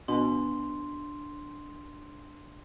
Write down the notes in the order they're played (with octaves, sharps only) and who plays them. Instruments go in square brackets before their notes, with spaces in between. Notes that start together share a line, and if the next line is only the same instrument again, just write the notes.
[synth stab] B2 [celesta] D4 [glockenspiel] C6